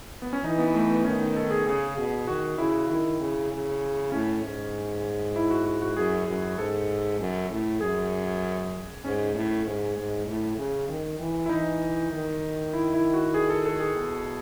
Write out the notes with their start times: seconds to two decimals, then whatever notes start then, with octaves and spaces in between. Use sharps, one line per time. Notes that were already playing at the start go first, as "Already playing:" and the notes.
0.22 B3
0.33 C#4
0.44 E3 D#4
0.58 B3
0.74 A3
0.90 B3
1.04 D#3 C#4
1.21 D#4
1.36 A4
1.51 G#4
1.66 C#3 G#4
1.97 B2
2.27 D#3 F#4
2.58 C#3 E4
2.90 D#3 E4
3.20 C#3
3.51 C#3
4.12 A2 C#4
4.43 G#2
5.36 E4
5.51 F#4
5.65 F#4
5.82 F#4
5.97 F#2 G#4
6.28 F#2
6.58 G#2 A4
7.20 F#2
7.51 A2
7.81 F#2 G#4
9.04 G#2 C#4
9.35 A2
9.66 G#2
9.96 G#2
10.27 A2
10.58 C#3
10.88 D#3
11.19 E3
11.46 E4
11.49 E3 D#4
12.11 D#3
12.74 E4
12.94 E4
13.14 F#4
13.34 G#4
13.50 A4
13.66 A4
13.80 G#4
13.96 B2